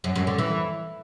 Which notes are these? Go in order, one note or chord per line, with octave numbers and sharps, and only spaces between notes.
F#2
F#2
D3
E3